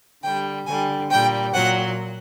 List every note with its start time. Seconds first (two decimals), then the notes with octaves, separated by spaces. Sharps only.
0.24 D3 G3 G5
0.66 D3 G3 G#5
1.10 A#2 G3 G5
1.53 A#2 F#3 F#5